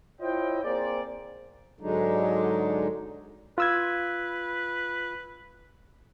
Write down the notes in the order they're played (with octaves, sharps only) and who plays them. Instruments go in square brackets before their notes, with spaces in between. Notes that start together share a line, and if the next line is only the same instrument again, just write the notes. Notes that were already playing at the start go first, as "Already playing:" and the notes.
[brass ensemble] E4 F4 C5 C#5 D#5 G5
A#3 C4 G#4 C5 D5
[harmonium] G#2 D3 F#3 G#3 D4 D#4
[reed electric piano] F4 E6 G#6 [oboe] B4